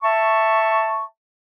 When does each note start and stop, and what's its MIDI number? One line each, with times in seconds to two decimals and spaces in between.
0.02 1.04 76
0.02 1.04 81
0.02 1.04 85